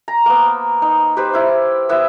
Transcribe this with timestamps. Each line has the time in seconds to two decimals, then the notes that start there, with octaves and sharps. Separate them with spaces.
0.08 A#5
0.26 A#3 B3
0.82 D#4
1.17 G4 B4 C5
1.33 E4 F5
1.89 B3 E4 E5 F#5